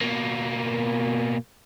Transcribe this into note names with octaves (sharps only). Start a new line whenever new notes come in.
B2 A#3